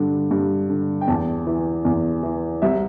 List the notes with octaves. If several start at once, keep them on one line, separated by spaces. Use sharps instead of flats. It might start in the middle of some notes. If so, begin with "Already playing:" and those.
Already playing: G2 D3
G2
D3
G5
E2 A5
E3
E2
E3
C2 E5